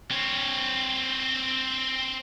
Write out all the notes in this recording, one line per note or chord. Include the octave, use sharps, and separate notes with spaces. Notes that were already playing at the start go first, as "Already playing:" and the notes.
C4 C#5